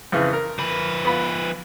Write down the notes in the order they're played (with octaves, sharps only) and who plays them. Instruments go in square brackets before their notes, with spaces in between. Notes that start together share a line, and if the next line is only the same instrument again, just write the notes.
[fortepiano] F2 C#3 E3
A#4
[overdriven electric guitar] F3 B4
[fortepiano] B3 F4 B5